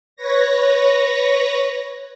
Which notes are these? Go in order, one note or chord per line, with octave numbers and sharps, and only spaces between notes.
B4 C#5 A#6